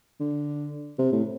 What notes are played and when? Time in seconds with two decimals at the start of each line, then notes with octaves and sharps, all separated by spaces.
0.20 D3
0.99 C3
1.12 A2